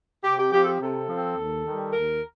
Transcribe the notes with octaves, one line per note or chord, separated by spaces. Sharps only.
C3 G4
G4
F3 C4 G4
A4
G4
C3 A4
F3 C4
D#2
D#3 G3
D#2 A#4